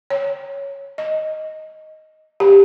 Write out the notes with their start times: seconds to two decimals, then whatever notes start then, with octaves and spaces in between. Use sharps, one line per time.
0.10 C#5
0.98 D#5
2.40 G4